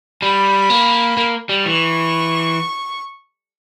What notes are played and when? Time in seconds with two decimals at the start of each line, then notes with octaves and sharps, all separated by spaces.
0.22 G3 B5
0.70 A#3
1.17 A#3
1.49 G3
1.65 E3 C#6